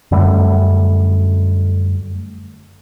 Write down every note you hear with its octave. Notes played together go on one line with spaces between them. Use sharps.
F#2 D3 G3 A3